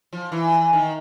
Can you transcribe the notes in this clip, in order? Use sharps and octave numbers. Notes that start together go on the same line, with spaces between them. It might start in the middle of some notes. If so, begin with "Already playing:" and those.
F3
E3
D#3